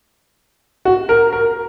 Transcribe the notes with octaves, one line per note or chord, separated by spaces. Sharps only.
F#4
A#4
A#4